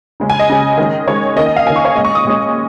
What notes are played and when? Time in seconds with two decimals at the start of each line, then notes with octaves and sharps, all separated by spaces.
0.20 C#3 G#3 C#4
0.30 G#5
0.39 D#5
0.49 C#3 G#3 C#4
0.78 D#3 G#3 C#4
1.07 D#3 G#3 C#4 C#5
1.36 D#3 A#3 C#4 D#5
1.46 D#5
1.56 F5
1.66 D#3 A#3 C#4 G#5
1.76 C#6
1.85 C#5
1.95 A#2 G#3 C#4 D#5
2.05 C#6
2.15 D#6
2.24 A#2 G#3 C#4